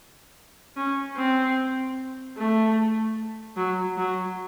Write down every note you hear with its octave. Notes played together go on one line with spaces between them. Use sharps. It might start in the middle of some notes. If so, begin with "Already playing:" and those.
C#4
C4
A3
F#3
F#3